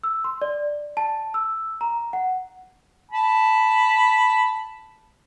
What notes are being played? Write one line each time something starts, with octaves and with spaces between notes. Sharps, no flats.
E6
C6
D5
A5
E6
A#5
F#5
A5 B5